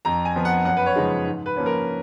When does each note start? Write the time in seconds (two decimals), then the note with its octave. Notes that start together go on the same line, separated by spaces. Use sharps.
0.05 F2 A#5
0.25 G#5
0.36 F3 B3
0.45 F#5
0.65 F#2 F#5
0.77 B4
0.86 C#5
0.95 C#3 F3 G#3 D#4
1.26 G#2
1.46 B4
1.57 F3 A#3 C#4
1.66 A#4